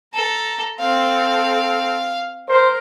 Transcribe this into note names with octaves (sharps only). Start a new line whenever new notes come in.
A4 A#5
C4 A4 F5
A#4 C5